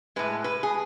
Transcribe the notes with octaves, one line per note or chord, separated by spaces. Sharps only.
A2 G#3 B4
B4
G#4